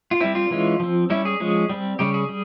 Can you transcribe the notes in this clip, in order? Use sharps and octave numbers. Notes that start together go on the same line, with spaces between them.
F4
G3 C4 E4
F4
E3 G#3 C#4
F3 C4
G3 C#4 E4
G#4
F3 G#3 C#4
G3 C4
C#3 G3 C#4 G4
G#4
G3